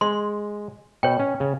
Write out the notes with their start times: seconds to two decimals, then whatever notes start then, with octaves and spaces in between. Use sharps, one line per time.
0.01 G#3 C6
1.03 B2 C#5 G5
1.19 C#4
1.40 C#3